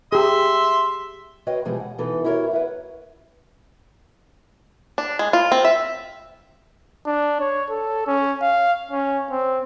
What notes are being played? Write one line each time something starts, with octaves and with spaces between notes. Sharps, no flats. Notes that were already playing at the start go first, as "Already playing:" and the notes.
G4 G#4 E5 C6
F#4 B4 C#5 D#5 F5 G5
B2 E3 F3 G#3 G4 G#4
F#5
B2 E3 D#4 A4 B4
E4 F#4 G4 A#4 C5 C#5
B4 E5 F#5
D4
G#3
F4
C4
E5
D4
C#5
A4
C#4
F5
C#4
C4